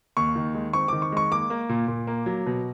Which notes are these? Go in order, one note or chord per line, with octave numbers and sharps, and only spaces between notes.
D#2 C#6
D#3
G#3
C4 C#6
D#3 D6
C#6
G#3 C#6
A#3 D6
A#3
A#2
A#2
A#3
F#3
B2